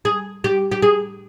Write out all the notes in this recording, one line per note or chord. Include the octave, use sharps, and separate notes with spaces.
G#4
G4
G4
G#4